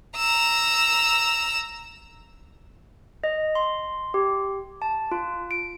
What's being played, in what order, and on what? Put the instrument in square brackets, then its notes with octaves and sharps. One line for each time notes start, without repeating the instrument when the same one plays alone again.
[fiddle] A#5 E6
[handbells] D#5
C6
G4
A5
F4
D7